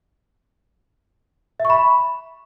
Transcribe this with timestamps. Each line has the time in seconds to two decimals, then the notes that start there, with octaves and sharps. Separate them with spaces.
1.60 E5
1.65 C#6
1.70 B5